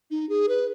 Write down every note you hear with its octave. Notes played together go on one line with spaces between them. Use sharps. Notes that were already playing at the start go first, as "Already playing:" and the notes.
D#4
G#4
B4